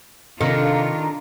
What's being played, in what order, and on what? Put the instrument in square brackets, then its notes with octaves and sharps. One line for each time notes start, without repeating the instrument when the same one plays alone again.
[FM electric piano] C3 F5 C#7 [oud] D#3 [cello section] D4 F4 [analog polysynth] A4 A#5